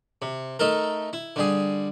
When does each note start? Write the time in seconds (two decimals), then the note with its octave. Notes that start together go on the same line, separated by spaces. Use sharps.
0.22 C3
0.59 A3 D#4 A4 A#4
1.13 E4
1.36 D3 G3 G#4